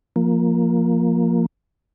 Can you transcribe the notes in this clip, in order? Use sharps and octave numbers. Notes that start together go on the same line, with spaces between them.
F3 A#3